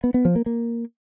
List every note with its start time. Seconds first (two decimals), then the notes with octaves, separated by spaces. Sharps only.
0.04 B3
0.14 B3
0.25 F3
0.36 A#3
0.46 A#3